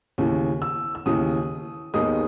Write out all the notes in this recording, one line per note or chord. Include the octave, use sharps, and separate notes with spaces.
D#2 C#3 E3
E6
E6
D#2 C#3 E3 D#6
D#2 D#3 G#3 B3 D#4 D#6